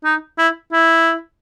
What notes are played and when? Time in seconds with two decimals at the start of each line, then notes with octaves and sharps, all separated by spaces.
0.04 D#4
0.38 E4
0.72 E4